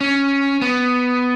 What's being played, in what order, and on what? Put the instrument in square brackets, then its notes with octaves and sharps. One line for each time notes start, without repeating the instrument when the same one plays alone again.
[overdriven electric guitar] C#4
B3